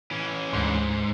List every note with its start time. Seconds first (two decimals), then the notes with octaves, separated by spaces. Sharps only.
0.11 E3 C#4
0.53 D2 G#2 C6